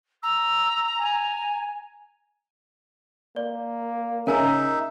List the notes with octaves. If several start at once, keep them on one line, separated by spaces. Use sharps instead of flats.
A#5 E6
G#5
A#3 D5
C#3 D#4 A#4 E5 G#5 A#5